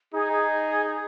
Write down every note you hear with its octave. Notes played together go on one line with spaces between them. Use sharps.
D#4 G#4
G#4
G#4